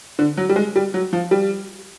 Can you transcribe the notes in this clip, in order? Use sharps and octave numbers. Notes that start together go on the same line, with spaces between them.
D3
F#3
G3
G#3
G3
F#3
F3
G3